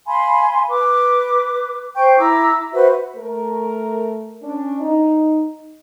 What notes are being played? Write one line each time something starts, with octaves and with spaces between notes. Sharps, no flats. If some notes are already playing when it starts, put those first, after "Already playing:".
F5 G#5 B5 C6
B4 D6
C5 G5 C#6 G6
E4 A#5 D6 E6
F#4 B4 C5 E5
A3 A#4
C#4 D4
D#4